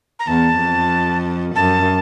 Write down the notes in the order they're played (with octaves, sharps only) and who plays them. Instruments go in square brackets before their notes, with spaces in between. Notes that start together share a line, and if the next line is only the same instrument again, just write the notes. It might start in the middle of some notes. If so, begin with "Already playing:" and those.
[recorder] A#5
[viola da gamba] E2 [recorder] A5
[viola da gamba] F2
[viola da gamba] F#2 [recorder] A5